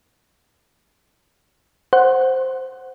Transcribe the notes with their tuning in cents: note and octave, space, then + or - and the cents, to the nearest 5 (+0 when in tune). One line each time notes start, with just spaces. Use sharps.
C5 +0 F#5 +0